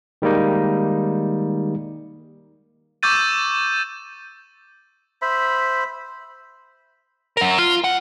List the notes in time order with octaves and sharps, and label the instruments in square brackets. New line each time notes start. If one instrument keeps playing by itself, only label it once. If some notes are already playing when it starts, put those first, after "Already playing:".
[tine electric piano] D#3 G3 G#3 A#3 D#4
[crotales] C#6 D6 E6 G6 A6 D#7
[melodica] C5 E5 B5
[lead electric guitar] F#3 A#4
F4
F#5